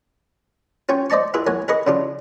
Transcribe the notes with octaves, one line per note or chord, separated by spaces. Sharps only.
C#4 F4 C#5 G5
C5 D5 D#5 A5 C#6
E4 F4 G#4 B4
A#4 C#5 F#5 G#5
G#4 A#4 B4 D#5 C#6
C#3 D4 F4